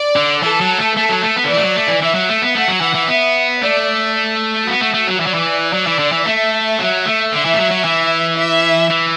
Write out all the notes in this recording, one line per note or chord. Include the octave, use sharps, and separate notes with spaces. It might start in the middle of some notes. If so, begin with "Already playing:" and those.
Already playing: D5
D3
E3 A4
F#3
A3
A3 A4
F#3
A3
B3
D3
E3 D5
A3
F#3
A3
E3
E3 E5
F#3
A3
B3
A3 F#5
F#3
E3
E3
B3 E5
A3 D5
B3 F#4
A3
A3
F#3
E3 D5
F#3
E3
F#3 D5
E3
D3
E3
A3 E5
F#3
A3
D3 E5
E3
A3
F#3
F#3
E3
E5
E3